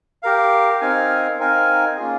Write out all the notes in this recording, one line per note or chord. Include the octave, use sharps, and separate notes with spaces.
G4 A#4 F5
C4 D#4 A#4 F5 G#5
C4 D#4 A#4 F5 G#5
A#3 C#4 F4 G#4